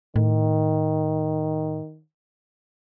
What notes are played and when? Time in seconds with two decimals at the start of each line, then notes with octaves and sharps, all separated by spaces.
0.16 A2 D#3